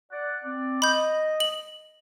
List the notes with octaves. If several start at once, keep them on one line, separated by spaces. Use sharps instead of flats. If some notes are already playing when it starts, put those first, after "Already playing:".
D5 F#5
C4 D5
D#5 B5 G6
F#7